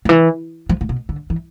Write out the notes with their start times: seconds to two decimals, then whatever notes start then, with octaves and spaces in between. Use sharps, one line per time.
0.05 D3
0.09 E3
0.69 F3
0.81 A2
0.89 B2
1.09 D3
1.30 E3